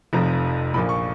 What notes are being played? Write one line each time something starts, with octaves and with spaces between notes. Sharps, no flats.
F1 F2 F3 A#5
A#1 A#2 F3 B5
C#6